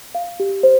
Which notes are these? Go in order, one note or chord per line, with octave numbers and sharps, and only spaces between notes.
F5
G4
C5